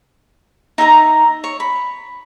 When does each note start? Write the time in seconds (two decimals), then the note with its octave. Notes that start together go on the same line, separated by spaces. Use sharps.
0.78 D#4 E5 G5 A#5
1.44 C#5
1.60 B5